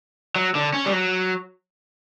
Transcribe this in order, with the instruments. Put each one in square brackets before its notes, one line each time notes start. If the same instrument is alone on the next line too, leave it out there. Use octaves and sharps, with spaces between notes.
[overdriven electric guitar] F#3
D3
C#4
G3
F#3